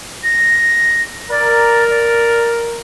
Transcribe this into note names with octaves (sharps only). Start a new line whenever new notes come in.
A#6
A#4 D5
D5